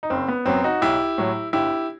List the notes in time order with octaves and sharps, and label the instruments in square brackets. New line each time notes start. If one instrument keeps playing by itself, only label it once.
[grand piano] D#4
F#1 C4
B3
F#2 F#3 B3 C4
D#4 F#4
B1 E4 G4
A2 F#3
G1 E4 G4